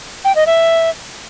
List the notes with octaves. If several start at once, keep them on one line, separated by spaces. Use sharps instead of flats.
G5
D#5
E5